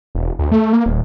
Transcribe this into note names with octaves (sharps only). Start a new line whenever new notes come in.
E1
D2
A3
A#3
D#1